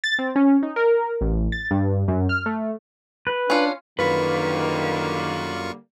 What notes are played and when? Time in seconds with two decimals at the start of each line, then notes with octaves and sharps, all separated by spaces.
0.04 A6
0.19 C4
0.36 C#4
0.63 D#4
0.76 A#4
1.21 A1
1.52 A6
1.71 G2
2.08 F#2
2.29 F6
2.46 A3
3.27 B4
3.50 C#4 D4 F4
3.99 F#2 D3 D#3 G3 A#3 F4 B4 C#6